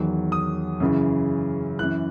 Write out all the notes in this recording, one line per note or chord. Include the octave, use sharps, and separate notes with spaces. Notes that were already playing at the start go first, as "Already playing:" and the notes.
Already playing: E2 D#3 F#3
D#6
F#2 C#3 E3
F#2 E3 F#6